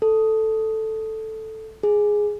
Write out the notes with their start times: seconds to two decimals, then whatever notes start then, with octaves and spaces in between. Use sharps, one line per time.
0.02 A4
1.83 G#4